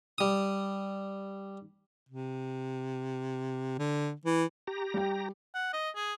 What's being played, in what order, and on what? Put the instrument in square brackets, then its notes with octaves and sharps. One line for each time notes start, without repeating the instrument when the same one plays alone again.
[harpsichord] G3 D#6
[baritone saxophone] C3
D3
E3
[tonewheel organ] G4 A#5
[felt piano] G3 G5
[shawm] F#5
D#5
G#4